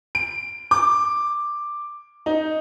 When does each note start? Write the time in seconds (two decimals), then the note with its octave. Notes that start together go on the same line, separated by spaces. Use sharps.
0.15 D7
0.71 D6
2.26 D#4